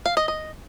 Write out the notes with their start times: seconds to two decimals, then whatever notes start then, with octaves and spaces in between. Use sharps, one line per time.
0.06 F5
0.17 D#5
0.28 D#5